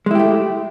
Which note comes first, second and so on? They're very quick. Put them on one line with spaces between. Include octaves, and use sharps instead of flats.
G#3 E4 G4 A3